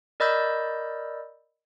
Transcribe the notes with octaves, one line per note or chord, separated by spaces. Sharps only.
A#4 D5 D#5 B5 E6 G6